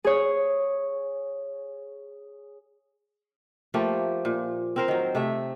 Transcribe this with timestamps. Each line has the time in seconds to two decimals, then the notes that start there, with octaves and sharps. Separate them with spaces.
0.04 G#4 C#5
3.74 F3 A3 A#3 G4
4.25 A#2
4.76 C4 A#4 C5
4.88 D#3 F#3
5.15 C3 A3 E5